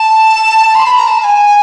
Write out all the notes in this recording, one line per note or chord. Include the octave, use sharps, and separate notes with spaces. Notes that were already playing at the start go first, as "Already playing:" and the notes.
Already playing: A5
C6
B5
A#5
A5
A5
G#5